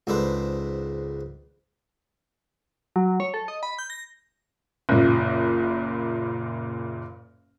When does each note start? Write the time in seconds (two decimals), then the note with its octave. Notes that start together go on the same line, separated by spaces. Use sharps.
0.07 C#2 G#2 D4 A4 B4 C5
2.96 F#3
3.20 C#5
3.34 A4
3.48 D#5
3.63 B5
3.79 G6
3.90 A#6
4.89 F#1 A#2